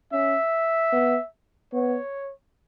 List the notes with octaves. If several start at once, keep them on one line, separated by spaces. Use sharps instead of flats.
C#4 E5
B3
B3 C#5